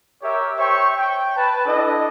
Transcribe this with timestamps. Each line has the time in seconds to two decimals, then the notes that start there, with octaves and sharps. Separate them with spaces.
0.22 G4 A#4 C#5 E5
0.57 C5 C#5 E5 G5 C#6
0.97 G5
1.36 B4 A5
1.65 D4 E4 A4 D#5